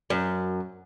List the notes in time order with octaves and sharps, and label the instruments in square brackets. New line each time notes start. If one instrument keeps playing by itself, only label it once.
[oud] F#2